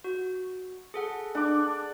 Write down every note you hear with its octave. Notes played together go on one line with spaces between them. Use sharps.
F#4
G#4 A4 F#5
D4 D6